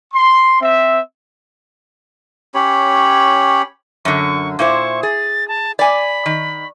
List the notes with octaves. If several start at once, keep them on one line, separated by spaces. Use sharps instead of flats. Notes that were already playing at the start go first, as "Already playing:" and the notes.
C6
C4 E5
C#4 G4 C#5 B5
F#2 D3 C#6
A#2 E4 C5 C#6
G#4 A6
A5
D5 G#5 B5
D#3